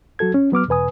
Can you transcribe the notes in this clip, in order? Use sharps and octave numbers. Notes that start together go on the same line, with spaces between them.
F#3 F#4 A4 G#6
C#4
F#3 B3 D6 F6
E2 B2 B4 G#5 D#6